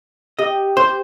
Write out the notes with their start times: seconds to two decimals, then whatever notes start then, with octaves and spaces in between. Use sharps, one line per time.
0.39 G4 D#5
0.77 C5